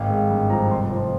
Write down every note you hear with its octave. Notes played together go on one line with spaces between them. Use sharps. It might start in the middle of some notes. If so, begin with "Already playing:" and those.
Already playing: G#1 F5
G#3
G2
F3 A#5
F1 C6
F3